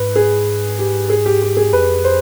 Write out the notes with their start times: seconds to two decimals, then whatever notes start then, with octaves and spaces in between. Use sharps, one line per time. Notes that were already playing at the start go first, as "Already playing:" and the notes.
Already playing: G#2 B4
0.16 G#4
0.79 G4
1.10 G#4
1.26 G4
1.42 G4
1.57 G#4
1.73 F2 B4
2.05 C5